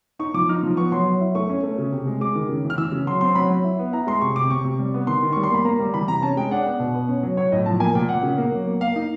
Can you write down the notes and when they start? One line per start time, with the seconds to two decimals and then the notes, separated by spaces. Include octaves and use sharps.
0.19 D#4 C#6
0.34 F3 D6
0.49 D#4 F6
0.63 F3
0.77 B3 C#6
0.92 F#3 C6
1.06 F#3
1.21 E4
1.35 A3 C#6
1.49 C#4
1.63 A3
1.78 C#3
1.92 C3
2.07 G#3
2.21 G#3 D6
2.35 D#3
2.49 C#3
2.64 E3
2.70 F6
2.78 E3 E6
2.92 C#3
3.07 F#3 C6
3.21 C4 C6
3.35 F#3 B5
3.50 F#3
3.64 E4
3.79 B3
3.93 E4 A#5
4.07 G#3 C6
4.21 C3 C#6
4.36 C3 D6
4.50 C3 C#6
4.64 C3
4.79 G3
4.94 B3
5.07 D#3 C6
5.23 D#3
5.32 G3 C#6
5.43 C6
5.51 A#3 B5
5.65 A#3 A#5
5.79 G3
5.94 E3 B5
6.08 C3 A#5
6.22 C#4 A5
6.37 G#3 G5
6.51 D4 F#5
6.66 B3
6.79 B2
6.94 B3
7.09 C#4
7.23 F#3
7.37 F#3 C#5
7.52 A2 D#5
7.66 F3 A5
7.80 A#3 G#5
7.95 A#2 G5
8.09 A#2 F#5
8.23 C#3
8.38 A#3
8.52 F#3
8.67 A#3
8.81 A#3 F5
8.96 D#4